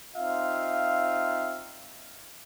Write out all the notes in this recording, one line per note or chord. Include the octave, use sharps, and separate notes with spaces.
C4 D#4 F4 E5 F5